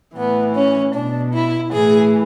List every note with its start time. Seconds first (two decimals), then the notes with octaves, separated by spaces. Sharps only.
0.16 A2 E3 B3
0.55 C#4
0.94 B2 D4
1.33 E4
1.72 A2 E3 G#4